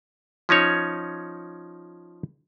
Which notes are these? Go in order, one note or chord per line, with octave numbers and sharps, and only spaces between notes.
F3 C#4 D#4 C#5